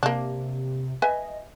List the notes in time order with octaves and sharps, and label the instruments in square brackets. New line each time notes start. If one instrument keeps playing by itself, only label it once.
[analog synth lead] C3 [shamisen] A#3 D4
[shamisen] B4 E5 G#5 [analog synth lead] D#5